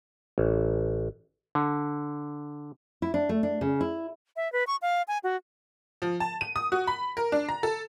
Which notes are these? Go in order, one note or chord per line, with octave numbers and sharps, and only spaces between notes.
A1
D3
E4
D4
A3
D4
C#3
E4
E5
B4
C#6
F5
G#5
F#4
F3
A5
D#7
D#6
F#4
B5
A#4
D4
A#5
A4